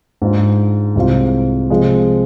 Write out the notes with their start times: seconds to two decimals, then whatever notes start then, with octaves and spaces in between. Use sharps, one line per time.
0.22 G#2 G#3 D4 F4
0.95 C2 C3 G#3 C4 F4
1.70 C3 F3 G#3